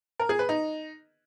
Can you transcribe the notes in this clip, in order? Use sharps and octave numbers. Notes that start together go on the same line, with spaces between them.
A#4
G#4
B4
D#4